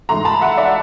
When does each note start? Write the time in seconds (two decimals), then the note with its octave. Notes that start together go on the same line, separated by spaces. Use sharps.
0.09 G#2 E3 A3 A#5 C6
0.25 A5 B5
0.41 E5 F#5
0.57 D5 E5